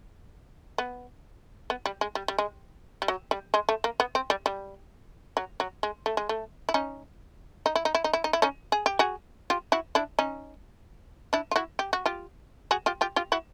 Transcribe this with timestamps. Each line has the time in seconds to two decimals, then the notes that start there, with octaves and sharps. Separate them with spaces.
0.78 B3
1.70 B3
1.86 G3
2.01 G#3
2.15 G3
2.28 G3
2.39 G#3
3.02 G3
3.08 F#3
3.31 G3
3.54 G#3
3.69 A3
3.84 A#3
4.00 B3
4.15 C4
4.30 G3
4.46 G3
5.37 F#3
5.60 F#3
5.83 G#3
6.06 A3
6.17 G#3
6.29 A3
6.69 E4
6.74 C#4 D#4
7.66 D#4
7.75 E4
7.85 D#4
7.95 E4
8.04 D#4
8.13 E4
8.24 D#4
8.33 E4
8.42 C#4 D#4
8.72 G#4
8.86 G4
8.99 F#4 G#4
9.50 F4 G4
9.72 E4 F#4
9.95 D4 E4
10.19 C#4 D#4
11.33 D4 E4
11.51 F4
11.56 E4 F#4
11.79 G4
11.93 F#4
12.06 F4 G4
12.71 F#4 G#4
12.86 F4 G4
13.01 F4 G4
13.16 F4 G4
13.32 E4 F#4